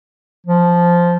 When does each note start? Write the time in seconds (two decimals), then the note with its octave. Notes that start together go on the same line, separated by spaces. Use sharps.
0.47 F3